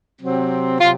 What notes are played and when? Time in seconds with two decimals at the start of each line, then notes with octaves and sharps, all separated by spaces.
0.19 C3 F#3 C4
0.80 C3 F#3 F4